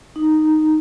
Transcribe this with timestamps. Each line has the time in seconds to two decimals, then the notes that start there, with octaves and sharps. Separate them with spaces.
0.16 D#4